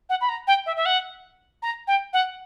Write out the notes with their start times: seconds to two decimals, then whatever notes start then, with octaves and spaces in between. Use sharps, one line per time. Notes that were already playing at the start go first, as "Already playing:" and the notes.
0.09 F#5
0.21 B5
0.28 A#5
0.47 G5
0.66 E5
0.76 E5
0.85 F#5
1.62 A#5
1.87 G5
2.13 F#5